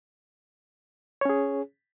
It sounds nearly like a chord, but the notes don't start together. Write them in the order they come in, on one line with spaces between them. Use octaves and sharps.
C#5 C#4 G#4